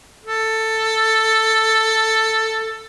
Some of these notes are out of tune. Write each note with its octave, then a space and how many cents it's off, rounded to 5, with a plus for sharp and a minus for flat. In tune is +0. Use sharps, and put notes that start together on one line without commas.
A4 +10